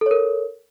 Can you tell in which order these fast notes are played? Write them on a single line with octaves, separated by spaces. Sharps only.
A4 C#5 A#4